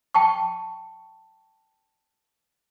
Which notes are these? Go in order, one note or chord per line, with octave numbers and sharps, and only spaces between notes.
G5 A5 C#6